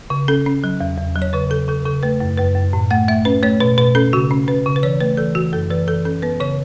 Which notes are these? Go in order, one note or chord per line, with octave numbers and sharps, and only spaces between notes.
C#3
C#4 A4
C#4
F#3
E2
E2
F#3
C#5
C#3 B4
C#3 A4
C#3 A4
C#3 A4
A3 B4
F#2
F#2 B4
F#2
A2
A3 F#5
A3 E5
C#4 B4
A3 C#5
B2 B4
B2 B4
C#4 A4
C#3 F#4
C#4
C#4 B4
C#3
B4
E3 C#5
A3 B4
E3 A4
E3 F#4
F#2 A4
E3 B4
E3 A4
C#4 A4
B3 B4
C#3 C#5